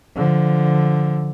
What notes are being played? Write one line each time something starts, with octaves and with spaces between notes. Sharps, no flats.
D3 F3